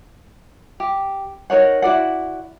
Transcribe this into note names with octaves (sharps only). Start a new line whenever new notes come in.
G4
D#4 A#4 C#5 F#5
E4 F#4 D5 F#5